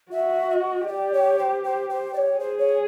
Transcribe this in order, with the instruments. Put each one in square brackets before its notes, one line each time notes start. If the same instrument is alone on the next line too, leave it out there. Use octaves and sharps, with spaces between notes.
[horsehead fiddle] F#4 [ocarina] E5
[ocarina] E5
D#5
[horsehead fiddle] G4 [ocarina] D5
[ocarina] C#5
C5
C5
C5
D5
C#5
[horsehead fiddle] G#4 [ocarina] C5
[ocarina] C#5